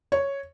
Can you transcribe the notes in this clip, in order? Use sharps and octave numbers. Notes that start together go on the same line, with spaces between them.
C#5